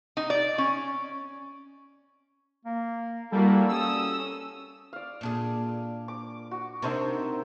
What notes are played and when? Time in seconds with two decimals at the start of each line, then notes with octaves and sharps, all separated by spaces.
0.17 D#4
0.30 D5
0.58 C#4
2.65 A#3
3.32 G3 A#3 E4 F#4 A4
3.69 C#4 D#6 E6
4.93 D5 F5
5.21 A#2 D4 G#4
6.08 D6
6.51 F#4
6.82 C3 D4 D#4 A#4 C5 E5